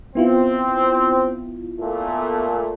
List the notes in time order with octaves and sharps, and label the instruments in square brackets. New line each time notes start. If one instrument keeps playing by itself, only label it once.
[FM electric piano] B3 E4 F4 [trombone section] C4
[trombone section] A#2 A3